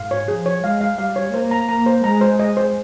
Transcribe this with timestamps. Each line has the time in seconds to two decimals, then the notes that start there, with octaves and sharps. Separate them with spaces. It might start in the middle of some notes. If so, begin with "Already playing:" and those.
Already playing: G#2 F5
0.11 C#5
0.28 F3 G#4
0.46 C#5
0.63 G#3 F5
0.81 F5
0.98 G3 F5
1.16 C#5
1.33 A#3 C5
1.51 A#5
1.69 A#3 A#5
1.86 C5
2.04 G#3 A#5
2.21 C5
2.39 D#5
2.57 C5